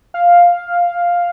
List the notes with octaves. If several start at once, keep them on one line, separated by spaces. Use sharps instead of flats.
F5